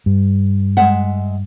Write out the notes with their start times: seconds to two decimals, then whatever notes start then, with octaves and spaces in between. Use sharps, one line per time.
0.06 G2
0.77 G#3 E5 F#5